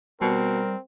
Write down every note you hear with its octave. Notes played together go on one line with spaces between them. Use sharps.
B2 G3 C4 A#4